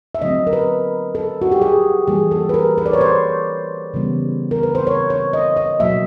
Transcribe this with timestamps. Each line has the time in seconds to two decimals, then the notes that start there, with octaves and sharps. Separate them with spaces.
0.15 E5
0.22 D3 F#3 A3 C4 D#5
0.47 A#4
0.53 B4
1.15 A4
1.42 F#4
1.52 G4
1.61 G#4
2.07 E3 G3 A#3 G#4
2.31 A4
2.49 B4
2.54 A#4
2.78 B4
2.86 D5
2.93 C#5
3.01 C5
3.94 C#3 E3 G3 B3
4.51 A#4
4.63 B4
4.75 C5
4.87 C#5
5.10 C#5
5.33 D#5
5.57 D#5
5.80 B2 F#3 A#3 E5